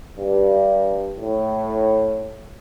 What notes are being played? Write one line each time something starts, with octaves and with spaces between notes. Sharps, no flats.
G2
A2